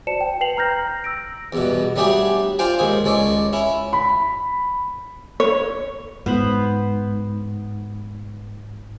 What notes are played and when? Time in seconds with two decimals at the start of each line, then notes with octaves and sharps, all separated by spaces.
0.07 F#4 C5 D5 A5 C#7 E7
0.21 G5
0.41 B4 G5 C7 F7 F#7
0.57 A#5 F6 G6 A#6
1.04 E6 A#6 D7
1.53 E2 G2 B2
1.96 F#3 G3 A3 D4 G4 G#4
2.59 D4 F4 C5 G5 G#5
2.79 D#2 G#2 G#4
3.04 C#2 G#3 A4 C#5 D5
3.53 C#4 E4
3.93 B5
5.40 C#5
6.26 G#2 B3 C5 B5